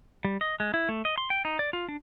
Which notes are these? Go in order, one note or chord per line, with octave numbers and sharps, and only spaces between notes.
G3
D#5
G#3
E4
A3
D#5
C6
G5
D#4
D5
F4
D4